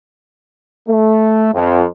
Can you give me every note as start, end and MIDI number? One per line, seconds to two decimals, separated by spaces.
0.88 1.50 57
1.54 1.84 41